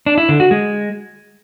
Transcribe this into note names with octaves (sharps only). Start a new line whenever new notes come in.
D4
E4
D3
F#4
G#3